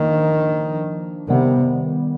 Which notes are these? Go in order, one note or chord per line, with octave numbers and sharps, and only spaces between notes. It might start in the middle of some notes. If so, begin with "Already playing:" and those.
Already playing: D#3 F3 A#3 D4
C3 D#3 G3 B3